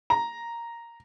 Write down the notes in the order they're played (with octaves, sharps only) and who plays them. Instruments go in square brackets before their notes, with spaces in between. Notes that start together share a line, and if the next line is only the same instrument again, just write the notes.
[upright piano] A#5